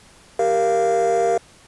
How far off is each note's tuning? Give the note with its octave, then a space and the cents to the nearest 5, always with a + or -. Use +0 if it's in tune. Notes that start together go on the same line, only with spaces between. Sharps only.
G4 +0 A#4 +0 F5 -20